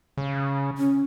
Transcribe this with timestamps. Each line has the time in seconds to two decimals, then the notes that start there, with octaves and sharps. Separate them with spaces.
0.17 C#3
0.78 C#4